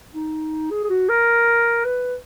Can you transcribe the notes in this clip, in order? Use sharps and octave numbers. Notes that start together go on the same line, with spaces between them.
D#4
G#4
G#4
F#4
A#4
B4